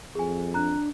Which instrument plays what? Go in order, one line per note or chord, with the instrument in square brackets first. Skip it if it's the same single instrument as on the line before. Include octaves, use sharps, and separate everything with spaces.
[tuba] F2 [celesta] G#4 G#5
[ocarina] D4 [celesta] A#5 F#6